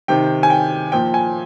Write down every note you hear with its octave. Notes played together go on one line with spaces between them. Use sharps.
C3 D#3 G5
G#5
G5
A#2 F3 G5
G#5